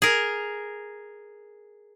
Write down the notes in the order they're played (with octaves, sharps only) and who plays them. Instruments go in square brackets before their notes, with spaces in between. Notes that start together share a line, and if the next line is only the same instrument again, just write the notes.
[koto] G#4 A#4